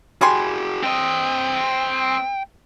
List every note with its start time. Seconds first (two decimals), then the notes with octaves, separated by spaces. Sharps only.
0.21 G3 F#4 G#4 G#5 C6
0.84 C4 D#5 G5